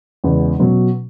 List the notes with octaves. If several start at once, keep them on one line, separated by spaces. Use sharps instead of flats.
E2 C#3 G#3 B3
B2 F#3 C#4